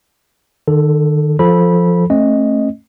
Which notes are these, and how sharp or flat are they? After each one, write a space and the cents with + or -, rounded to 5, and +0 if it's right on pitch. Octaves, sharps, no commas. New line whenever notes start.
D#3 -35 A4 +0
F3 +0 A4 +0 B5 -15
A3 +0 C#4 -40 D#5 +0